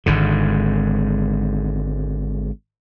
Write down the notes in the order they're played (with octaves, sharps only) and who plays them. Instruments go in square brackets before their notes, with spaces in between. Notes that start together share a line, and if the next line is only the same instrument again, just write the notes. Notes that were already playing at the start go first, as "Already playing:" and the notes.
[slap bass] G#1 G#2 D3